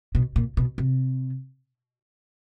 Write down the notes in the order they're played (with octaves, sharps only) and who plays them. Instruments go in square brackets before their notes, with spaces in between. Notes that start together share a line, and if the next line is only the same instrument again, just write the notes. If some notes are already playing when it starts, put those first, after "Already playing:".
[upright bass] B2
A#2
B2
C3